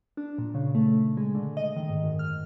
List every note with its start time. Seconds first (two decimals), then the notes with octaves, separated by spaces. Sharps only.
0.17 D4
0.38 A#2
0.54 C#3
0.75 A3
1.17 G#3
1.35 D3
1.57 D#5
1.77 D#3
1.89 G#2
2.04 F#2
2.19 F6